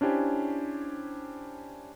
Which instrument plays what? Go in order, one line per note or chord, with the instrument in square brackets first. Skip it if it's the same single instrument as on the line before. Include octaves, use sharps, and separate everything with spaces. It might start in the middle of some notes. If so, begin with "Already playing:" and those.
[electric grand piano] C#4 D4 E4 G4 C5 G#5